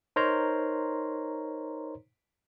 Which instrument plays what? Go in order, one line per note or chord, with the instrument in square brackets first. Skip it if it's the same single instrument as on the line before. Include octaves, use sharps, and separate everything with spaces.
[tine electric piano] D#4 A#4 C5 C#5 A#5 C6